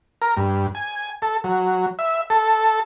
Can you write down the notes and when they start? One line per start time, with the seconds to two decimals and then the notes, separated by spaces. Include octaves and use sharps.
0.22 A#4
0.37 G2
0.75 G#5
1.22 A4
1.44 F#3
1.99 E5
2.30 A4